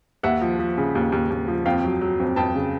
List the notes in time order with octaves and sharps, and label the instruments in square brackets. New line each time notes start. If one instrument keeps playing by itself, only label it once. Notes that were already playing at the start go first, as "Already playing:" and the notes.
[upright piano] D#2 E5 F#5
F3
F3
C#3
D#2
D#2
D#2
F3
F2 F5 G5
F#3
F#3
F2
F2 G5 A5
C#3